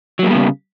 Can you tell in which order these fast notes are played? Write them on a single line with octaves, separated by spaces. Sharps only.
F#3 A#3 G3 B3 C#3